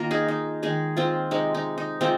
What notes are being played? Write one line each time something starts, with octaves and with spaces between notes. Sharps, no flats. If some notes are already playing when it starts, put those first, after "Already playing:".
Already playing: D#3 A#3 F4 A#4
D#4 G#4
D#4
D#3 G#3 D#4 G#4
C4 F4
C3 G#3 D#4
D#4
D#4
C3 G#3 C4 F4